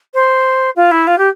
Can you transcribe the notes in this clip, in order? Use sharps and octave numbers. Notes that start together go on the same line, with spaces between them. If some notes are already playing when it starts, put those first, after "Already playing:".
C5
F4
E4
F4
G4